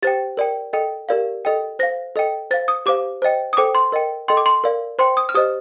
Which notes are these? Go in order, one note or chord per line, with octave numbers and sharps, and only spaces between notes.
G4 C5 G5 A6
A#4 D5 G5
A4 D#5 G5
G4 A#4 D5 F5
A4 D#5 G5
C5 F5 A#6
A4 D#5 G5
C5 F5 A6
D#6
G4 C5 F5 D6
C5 D#5 G5
D#6
A4 C5 G5 D6
C6
A#4 D#5 G5
A4 D#5 G5 C6
D6
C6
A#4 D5 F5
C5 G5 C6
D#6
F6
G4 C5 D#5 D#6